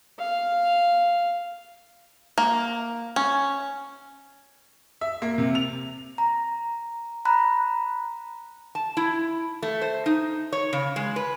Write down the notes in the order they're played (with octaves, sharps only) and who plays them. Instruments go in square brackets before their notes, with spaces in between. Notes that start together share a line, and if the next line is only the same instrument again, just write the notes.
[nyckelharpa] F5
[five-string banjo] A#3
C#4
[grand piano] E5
A#3
C3
F7
[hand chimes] A#5
A#5 B5 F#6
[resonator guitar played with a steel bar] A5
E4
A3
C5
D#4
C#5
C#3
G#3
B4